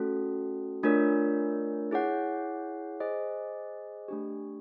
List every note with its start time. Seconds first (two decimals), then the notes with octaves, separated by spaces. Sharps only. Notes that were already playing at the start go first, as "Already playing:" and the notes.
Already playing: A3 C#4 F#4 A4
0.83 A3 D4 F4 A#4 C#5
1.91 E4 G#4 C#5 F#5
3.00 G#4 C5 D#5
4.08 A3 D4 G4